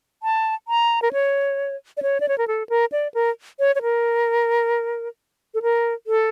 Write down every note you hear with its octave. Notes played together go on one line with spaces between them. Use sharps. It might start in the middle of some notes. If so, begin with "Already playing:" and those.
A5
A#5
A#4
C#5
D5
C#5
D5
C#5
A#4
A4
A#4
D5
A#4
C#5
C#5
A#4
A4
A#4
A4